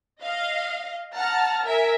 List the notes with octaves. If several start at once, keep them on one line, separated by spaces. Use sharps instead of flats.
D#5 F5
F#5 A5 A#5 F6
A#4 E5 G#5